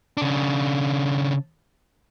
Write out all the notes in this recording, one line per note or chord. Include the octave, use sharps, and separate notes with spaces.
C#3 D4